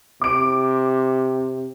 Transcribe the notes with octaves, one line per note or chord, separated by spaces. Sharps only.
C3 D6 D7